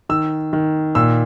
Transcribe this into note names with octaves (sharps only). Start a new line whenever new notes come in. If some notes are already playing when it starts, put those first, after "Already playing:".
D#3 E6
D#3
A#2 E6